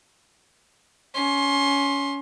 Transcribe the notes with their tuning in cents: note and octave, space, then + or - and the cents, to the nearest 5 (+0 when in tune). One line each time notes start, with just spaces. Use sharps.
C#4 +20 C6 +25